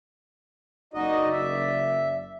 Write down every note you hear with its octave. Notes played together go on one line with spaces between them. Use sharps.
F#1 D#4 F#4 D5 D#5
E5